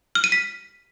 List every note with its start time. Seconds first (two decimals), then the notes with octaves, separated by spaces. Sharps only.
0.15 F6
0.24 D#7
0.32 B6